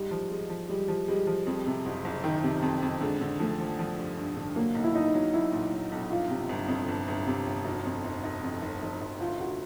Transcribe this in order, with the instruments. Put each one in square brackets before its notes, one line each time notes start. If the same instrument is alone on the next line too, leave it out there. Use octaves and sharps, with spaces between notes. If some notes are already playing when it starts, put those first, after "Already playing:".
Already playing: [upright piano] G#2 [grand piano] G3
[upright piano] F3
G#3
F3
[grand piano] G3 [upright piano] G#3
[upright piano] F3
[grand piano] G3 [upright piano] G#3
[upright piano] F3
[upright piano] F2 [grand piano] G3
[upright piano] C3
F#1
F#1
D#3
C3
F2
F2
[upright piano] D3 [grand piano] G#3
[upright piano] D3
[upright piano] F3 [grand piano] A3
[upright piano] F3
F3
G2
G2
D3
[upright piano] F#3 [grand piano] A#3
[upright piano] B1
[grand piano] E4
[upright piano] B1 [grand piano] D#4
[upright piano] F#3
[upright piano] F#3 [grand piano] E4
[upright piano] A#2
F#3
B1
[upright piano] G1 [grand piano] F4
[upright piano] C3
G1
F2
G1
G1
C3
G1
[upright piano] F1 [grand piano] F#4
[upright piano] F2
F1
F1
F2
F1
F1
F1
[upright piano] D2 [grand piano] F4
[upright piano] D2 [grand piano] F#4